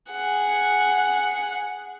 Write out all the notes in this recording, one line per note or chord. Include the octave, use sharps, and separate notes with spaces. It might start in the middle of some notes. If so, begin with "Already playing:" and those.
G#4 F#5